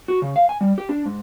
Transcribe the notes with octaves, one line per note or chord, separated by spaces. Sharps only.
F#4
C#3
F5
G#5
G3
G4
D4
G#2